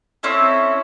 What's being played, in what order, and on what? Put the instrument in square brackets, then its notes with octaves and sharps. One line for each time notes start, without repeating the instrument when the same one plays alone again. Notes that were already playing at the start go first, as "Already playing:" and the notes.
[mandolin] C4 C#4 E4 A4